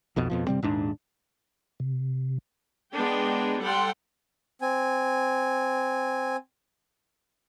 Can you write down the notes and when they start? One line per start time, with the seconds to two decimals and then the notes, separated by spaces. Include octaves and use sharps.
0.16 B1 F2 B2
0.30 F2 B2 F3
0.47 G1 C3 G3 C4
0.62 D#1 G#2 D4
1.80 C3
2.94 G#3 B3 D4 G5
3.61 G3 A4 F#5 G5 C6
4.61 C4 G#5